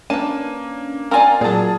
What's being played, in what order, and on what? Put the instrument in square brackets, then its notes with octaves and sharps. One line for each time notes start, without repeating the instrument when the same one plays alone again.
[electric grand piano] A#3 D#7 [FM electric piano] C#4 D4 [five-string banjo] B4 A5
[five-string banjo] C4 F4 D5 [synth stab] A#4 G#5 [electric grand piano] F5 F6
[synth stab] A#2 [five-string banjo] F#3 D5 [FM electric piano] A#3 [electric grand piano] G#4 A5